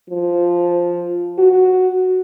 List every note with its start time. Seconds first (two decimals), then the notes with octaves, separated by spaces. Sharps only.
0.10 F3
1.38 F#4